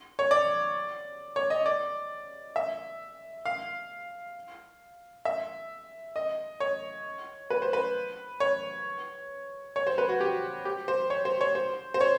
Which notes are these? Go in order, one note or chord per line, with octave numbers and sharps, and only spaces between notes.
C#5
D5
C#5
D#5
D5
E5
F5
E5
D#5
C#5
B4
C5
B4
C#5
C#5
C5
B4
F#4
G4
G4
C5
C#5
C5
C#5
C5
C5
C#5